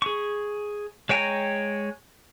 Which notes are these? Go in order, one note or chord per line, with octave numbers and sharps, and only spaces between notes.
G#4 C#6
G#3 C#5 G5 G#5 A#5